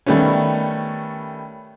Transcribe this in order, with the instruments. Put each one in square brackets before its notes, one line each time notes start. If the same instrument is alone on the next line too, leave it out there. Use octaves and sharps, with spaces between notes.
[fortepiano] D#3 G3 A3 B3 C#4